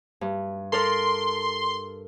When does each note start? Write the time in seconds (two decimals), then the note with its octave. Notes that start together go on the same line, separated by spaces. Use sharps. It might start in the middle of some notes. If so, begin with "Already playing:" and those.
0.21 G2
0.72 A4 A#4 D5 C6